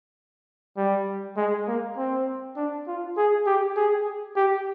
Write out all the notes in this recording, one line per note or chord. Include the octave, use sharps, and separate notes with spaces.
G3
G#3
A#3
C4
D4
F4
G#4
G4
G#4
G4